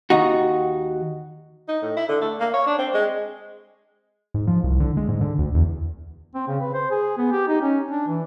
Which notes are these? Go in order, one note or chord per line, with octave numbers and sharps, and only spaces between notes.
D#2 D#4 F#4
D#4
A2
E4
D3
A3
A#3
C#5
D4
C4
G#3
G#2
F3
C2
D3
G#3
G#2
D3
D2
E2
C4
C#3
B4
C5
G#4
B3
G4
D#4
C#4
D4
E3